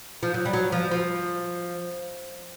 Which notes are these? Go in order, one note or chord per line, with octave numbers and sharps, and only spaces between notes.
F3
F#3
G3
F#3
F3
F3